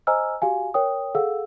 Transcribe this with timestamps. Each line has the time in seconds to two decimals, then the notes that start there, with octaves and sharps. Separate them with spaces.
0.07 C5 D#5 G#5 A#5 E6 F6
0.42 F#4 G4 F5 G#5
0.74 A#4 C#5 G5 D#6
1.15 G#4 A4 F5 F#5 E6